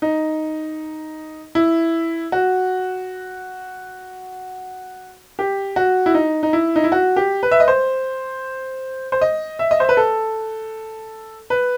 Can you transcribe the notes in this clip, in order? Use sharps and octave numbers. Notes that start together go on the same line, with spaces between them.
D#4
E4
F#4
G4
F#4
E4
D#4
D#4
E4
D#4
E4
F#4
G4
B4
E5
D#5
C5
C5
D#5
E5
D#5
C5
B4
A4
B4